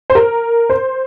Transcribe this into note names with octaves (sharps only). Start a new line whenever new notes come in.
C5
A#4
C5